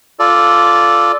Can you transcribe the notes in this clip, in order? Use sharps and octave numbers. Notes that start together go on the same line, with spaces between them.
F4 A4 D5